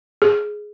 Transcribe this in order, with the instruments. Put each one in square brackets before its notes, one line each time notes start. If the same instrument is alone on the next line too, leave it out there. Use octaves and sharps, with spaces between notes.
[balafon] G#4